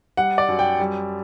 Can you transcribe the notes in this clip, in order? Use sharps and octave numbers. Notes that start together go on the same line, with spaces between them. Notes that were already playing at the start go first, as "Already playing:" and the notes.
G3 F#5
D5
F#2
G5
G3